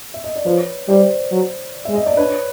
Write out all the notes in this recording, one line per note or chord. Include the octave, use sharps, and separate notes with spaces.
E5
D#5
D5
F3 B4 C#5
G3 C5 D5
F#3
G#3 E5
D#5
D5
D4 B4 C#5